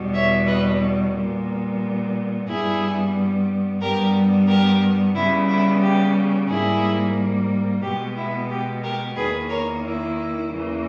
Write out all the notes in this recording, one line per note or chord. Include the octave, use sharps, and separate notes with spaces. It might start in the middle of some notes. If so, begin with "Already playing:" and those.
Already playing: E2 B2 G3 B3
C#5 E5
B4 D#5
A#2 G3 B3
G2 G3 B3 E4 G#4
G2 G3 B3 G4 A#4
G4 A#4
C#3 G3 B3 E4
E4
G4
G#2 G3 A#3 E4 G#4
B2 G#3 B3 G4
E4
G4
G4 A#4
E2 D#3 A#3 G#4 B4
A#4 C#5
E4
E2 C#3 E3 A#3